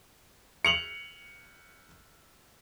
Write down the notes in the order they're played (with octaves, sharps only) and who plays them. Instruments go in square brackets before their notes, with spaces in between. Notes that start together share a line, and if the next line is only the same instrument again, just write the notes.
[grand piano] C#7 F7 F#7